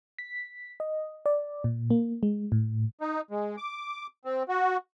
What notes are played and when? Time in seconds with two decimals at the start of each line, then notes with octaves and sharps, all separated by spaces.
0.19 B6
0.80 D#5
1.26 D5
1.64 A#2
1.90 A#3
2.23 G#3
2.52 A2
3.01 D#4
3.31 G#3
3.57 D6
4.25 C4
4.49 F#4